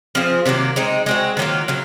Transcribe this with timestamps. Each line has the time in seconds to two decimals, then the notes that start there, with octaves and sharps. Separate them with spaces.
0.15 F3 C4 F4 G#4
0.45 C3 D#3 F#3 A#3
0.76 G#3 C4 D#4
1.06 G#3 C4 F#4
1.37 D#3 F#3 A#3 F4
1.68 C#3 F#3